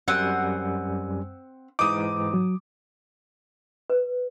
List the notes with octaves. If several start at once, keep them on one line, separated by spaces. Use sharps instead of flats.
F#2 G3 C4 F#5 G#5
G#2 E3 D#4 D6 D#6
F#3
B4